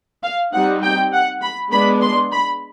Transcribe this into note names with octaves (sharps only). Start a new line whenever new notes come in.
F5
G3 C4 D#4 F#5
G5
F#5
B5
G#3 B3 D4 B5
C6
B5